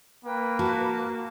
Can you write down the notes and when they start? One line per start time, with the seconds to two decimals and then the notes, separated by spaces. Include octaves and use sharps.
0.25 A#3 B4 G5
0.59 F#4 A5